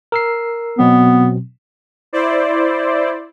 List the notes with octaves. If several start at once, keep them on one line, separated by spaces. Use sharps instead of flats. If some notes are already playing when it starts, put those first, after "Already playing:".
A#4 E6 C7
B2 F#3 B3 C4
E4 C5 D5